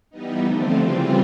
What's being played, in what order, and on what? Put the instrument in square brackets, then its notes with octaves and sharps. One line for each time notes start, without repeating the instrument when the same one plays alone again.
[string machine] E3 G3 B3 D#4
D3 F3 A3 C4 F4
C#3 E3 G3 C4 F4